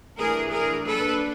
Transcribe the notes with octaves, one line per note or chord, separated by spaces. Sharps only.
E3 A3 D4 G#4 A#4
G#4 A#4
F#3 A#3 D4 A4 B4